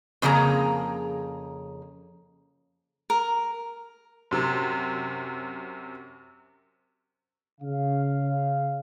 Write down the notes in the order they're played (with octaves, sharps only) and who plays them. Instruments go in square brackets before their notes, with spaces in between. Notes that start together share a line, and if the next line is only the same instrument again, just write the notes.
[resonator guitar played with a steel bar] F2 C#3 A#3 G#4 A#5
[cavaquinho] A#4
[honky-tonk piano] F#2 C3
[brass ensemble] C#3 F5